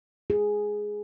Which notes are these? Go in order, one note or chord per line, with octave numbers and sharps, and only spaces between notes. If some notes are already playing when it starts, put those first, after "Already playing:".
G#4